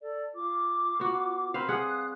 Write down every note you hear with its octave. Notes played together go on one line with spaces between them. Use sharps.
A4 D5
F4 D6
B3 F#4
C4 A#4 B4 F5 B5
G3 G#4 F5 F#5 D#6 F#6